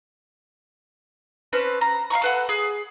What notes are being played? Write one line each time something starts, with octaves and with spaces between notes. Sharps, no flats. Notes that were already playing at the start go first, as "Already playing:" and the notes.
C4 C#4 B4 A5
A#5
F5 F#5 A#5 C#6
A4 B4 F#5
G#4